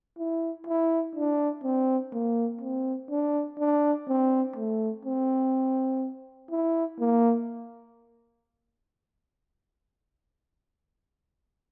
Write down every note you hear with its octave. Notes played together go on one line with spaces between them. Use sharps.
E4
E4
D4
C4
A#3
C4
D4
D4
C4
A3
C4
E4
A#3